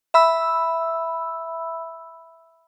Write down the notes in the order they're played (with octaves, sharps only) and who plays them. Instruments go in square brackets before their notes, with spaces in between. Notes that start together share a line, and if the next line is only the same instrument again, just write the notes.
[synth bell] E5 B5 E6